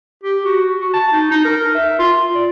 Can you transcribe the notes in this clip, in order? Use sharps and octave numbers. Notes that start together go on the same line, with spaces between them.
G4
F#4
F#4
A5
D#4
D#4
A#4
E5
F4
D5